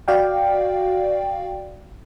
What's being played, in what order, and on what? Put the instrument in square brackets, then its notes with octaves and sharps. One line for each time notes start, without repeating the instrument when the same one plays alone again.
[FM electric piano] F#4 D5 F5 G5